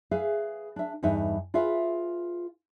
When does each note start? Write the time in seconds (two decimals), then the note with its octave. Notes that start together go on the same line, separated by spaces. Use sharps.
0.11 G#4 B4 E5 F5
0.76 D4 E5
1.03 E2 G2 D#4 E5
1.54 F4 G#4 B4 E5 F5